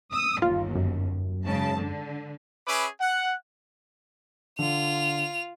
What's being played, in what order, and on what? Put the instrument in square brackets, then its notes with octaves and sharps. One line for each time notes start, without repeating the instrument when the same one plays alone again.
[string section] D#6 E6
[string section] G1 D#2 [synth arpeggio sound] F4
[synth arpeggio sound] F#2
[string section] G#2 C#3 A5
D3
[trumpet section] C#4 G#4 B4 E5 B5 D6
F#5
[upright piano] D3 [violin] F4 F7